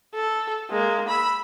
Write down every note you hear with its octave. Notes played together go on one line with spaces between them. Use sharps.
A4
G#3 A#3
B5 E6